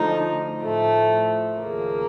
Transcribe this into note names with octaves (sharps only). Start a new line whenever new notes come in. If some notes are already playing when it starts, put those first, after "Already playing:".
Already playing: D2 D3 F3 D#4
A2 F3 A3
D#2 C#3 F3 A#3